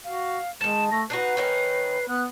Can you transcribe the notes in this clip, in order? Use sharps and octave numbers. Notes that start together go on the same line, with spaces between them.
F#4 F5
D#3 G#3 A5 E7
A3 A#6
D4 D#4 F#4 B4 C7
D#3 C#4 D#4
B3 F#6